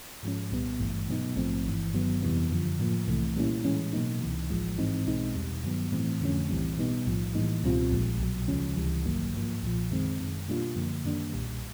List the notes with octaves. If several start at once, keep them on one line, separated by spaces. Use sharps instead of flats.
G#2 F3 G#3 C#4
C2 A#2 G3 B3
G#1 G2 E3 A3
B2 F#3 B3 D#4
A#1 G#2 F3 A3 C4
G1 G2 E3
G2 D#3 F#3 B3
F2 C3 E3 G3 B3
F#2 D3 F3
A2 F3 A#3
C2 C3 E3 A3
A#2 G3 A#3 C#4 E4
A2 E3 G#3 C#4
B2 F#3 A#3 D#4
C#2 C3 E3
A1 A2 F3 G#3
G#2 E3 G#3 C4 D#4
B1 B2 G#3 C4 D#4
E2 B2 G3
G2 D#3 F#3 B3
A2 E3 A3 C4
F2 D3 F3 A3 C#4
B1 A2 E3 G3 C4
B2 G3 B3 D#4
B1 A2 F3
A2 E3 G3 A#3 D#4
C#2 B2 G3 C4 F4
A#1 A#2 F3 G#3
B1 B2 F#3
D2 C#3 F3 G#3 C#4
C#2 C3 E3 G3
A1 G2 D#3 F#3 A#3
G#2 F3 A#3
B1 A#2 F3
F#2 D#3 G#3 C4
F#2 D#3 G#3
B2 G3 A#3 D4 F4
F#2 D3 F3 A#3
F#2 D#3 G3 A#3 D4
B1 A#2 G3